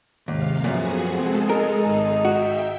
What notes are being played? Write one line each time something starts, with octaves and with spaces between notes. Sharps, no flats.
G#1 D#2 C3 F5
F#2 A#2 F3 A3 B3 F#4 G#4
G#3 C4 G#4 A4
D#4 A#4
G#1 D#4
F#4 E5 G5